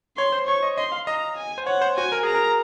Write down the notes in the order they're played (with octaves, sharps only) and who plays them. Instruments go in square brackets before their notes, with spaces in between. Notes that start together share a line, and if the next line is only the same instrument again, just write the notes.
[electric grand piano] C#5 [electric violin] C6
[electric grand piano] C5
[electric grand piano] C#5 [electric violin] C#6
[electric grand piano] D#5
[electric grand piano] D#5 [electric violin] C6
[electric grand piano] F5
[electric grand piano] D#5 [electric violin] A#5
[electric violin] G#5
[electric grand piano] C5
[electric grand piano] C#5 [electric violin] F#5
[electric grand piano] C5
[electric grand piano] F#4 [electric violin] G#5
[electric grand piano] A#4
[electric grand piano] G#4 [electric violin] A#5
[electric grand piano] A#4